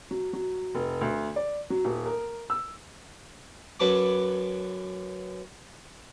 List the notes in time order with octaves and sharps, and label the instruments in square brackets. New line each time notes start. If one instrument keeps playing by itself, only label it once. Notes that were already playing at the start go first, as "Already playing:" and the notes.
[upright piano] F#3
F#3
F1
D2
D5
F#3
D#1
A#4
E6
[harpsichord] F#2 F#3 B4 A5 D6